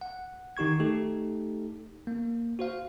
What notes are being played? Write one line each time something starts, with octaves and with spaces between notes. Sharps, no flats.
F#5
D#3 D#4 G4 C#6 G#6
A3 D#4 G4 A4
A#3
F#4 C5 F5